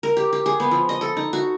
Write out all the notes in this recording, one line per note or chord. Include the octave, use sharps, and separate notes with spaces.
A#4
G4
G4
G#4
B3
F3
D#5
A4
D#4
F#4